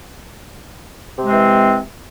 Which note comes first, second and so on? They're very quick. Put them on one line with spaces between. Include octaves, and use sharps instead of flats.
C3 G#3 C4 E3